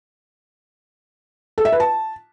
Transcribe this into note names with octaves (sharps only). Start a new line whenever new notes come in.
A4
E5
B4
A5